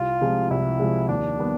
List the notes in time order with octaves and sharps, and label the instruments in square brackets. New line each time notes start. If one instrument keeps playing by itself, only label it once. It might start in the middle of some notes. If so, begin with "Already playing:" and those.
Already playing: [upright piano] C2 [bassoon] F4
[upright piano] C3 F3 G#3
[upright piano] C2 [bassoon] E4
[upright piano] C3 F3 G#3
[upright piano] D#2 [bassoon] D4
[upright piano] D#3 G3 B3